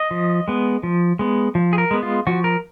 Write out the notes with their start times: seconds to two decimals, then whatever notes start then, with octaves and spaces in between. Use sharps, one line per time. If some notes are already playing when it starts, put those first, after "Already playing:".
Already playing: D#5
0.11 F3
0.48 G#3 B3
0.83 F3
1.19 G#3 B3
1.55 F3
1.73 G#4
1.78 A#4
1.91 G#3 B3
2.03 F4
2.27 F3 F#4
2.44 A#4